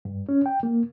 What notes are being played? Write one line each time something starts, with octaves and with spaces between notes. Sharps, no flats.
G2
C#4
G5
A#3